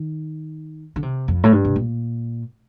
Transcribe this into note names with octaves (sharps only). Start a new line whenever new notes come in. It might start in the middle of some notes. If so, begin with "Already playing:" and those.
Already playing: D#3
D3
C3
F2
A2
G2
C3
A#2